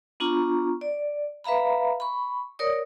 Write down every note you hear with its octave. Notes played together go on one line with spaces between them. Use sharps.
B3 D4 F4 A#5 C#6
D5
B4 E5 F5 A#5 B5
B5 C#6
A#4 C#5 D5 D#6